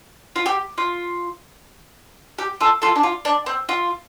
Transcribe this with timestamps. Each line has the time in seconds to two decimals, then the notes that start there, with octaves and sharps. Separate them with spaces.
0.36 F4
0.46 G4
0.78 F4
2.39 G4
2.61 F4 A4
2.82 F4 A4
2.96 D4
3.03 F4
3.25 D4
3.46 C4
3.69 F4